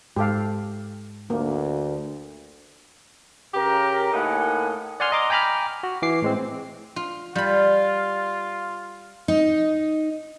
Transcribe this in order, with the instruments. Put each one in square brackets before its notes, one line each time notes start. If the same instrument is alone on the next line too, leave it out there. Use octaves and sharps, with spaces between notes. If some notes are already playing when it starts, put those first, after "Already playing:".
[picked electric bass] G#2 [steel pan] G4 A4 F5
[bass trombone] D2 [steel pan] A#3
[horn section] C#3 G4 A#4
A2 A#3 D#4 B4 F#5 G#5
[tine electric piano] D5 F#5 G#5 C6 F6
D#5 A#5 C6 D6
G5 G#5 A#5 B5 D6 F6
F#4
E3 D6 C7
A2 G#3 C4
[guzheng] F4
[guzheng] G3 B5 [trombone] F4
[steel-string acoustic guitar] D#4